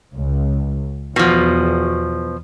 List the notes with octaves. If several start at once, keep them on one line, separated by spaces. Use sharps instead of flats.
C#2
E2 B2 F3